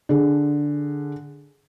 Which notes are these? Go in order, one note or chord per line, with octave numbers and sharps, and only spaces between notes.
D3 G#4